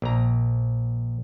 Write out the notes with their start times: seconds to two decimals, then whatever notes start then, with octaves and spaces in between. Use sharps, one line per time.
0.02 A#1 A#5